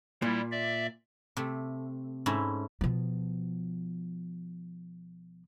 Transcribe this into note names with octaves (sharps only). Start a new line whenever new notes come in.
A#2 G3 E4
D5 E5
C3 A3
G#2 A3 C#4 E4
B2 F3